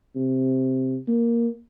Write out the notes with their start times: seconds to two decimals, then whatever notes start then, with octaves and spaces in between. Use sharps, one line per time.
0.16 C3
1.08 A#3